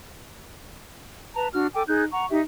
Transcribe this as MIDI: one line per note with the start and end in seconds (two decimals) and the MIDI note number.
1.35 1.47 71
1.35 1.47 81
1.35 1.47 82
1.52 1.67 62
1.52 1.67 66
1.52 1.67 89
1.74 1.82 69
1.74 1.82 79
1.74 1.82 80
1.74 1.82 86
1.87 2.04 63
1.87 2.04 68
1.87 2.04 90
1.87 2.04 91
2.11 2.26 78
2.11 2.26 82
2.11 2.26 85
2.30 2.40 63
2.30 2.40 67
2.30 2.40 76